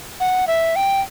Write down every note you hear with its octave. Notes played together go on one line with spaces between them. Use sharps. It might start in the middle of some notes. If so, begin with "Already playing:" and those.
F#5
E5
G5